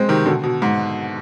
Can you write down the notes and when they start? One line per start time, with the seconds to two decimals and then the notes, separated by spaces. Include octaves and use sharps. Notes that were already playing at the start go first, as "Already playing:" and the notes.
Already playing: G#3 C4
0.08 C3 D#3
0.26 B2 D3
0.43 B2
0.62 G#2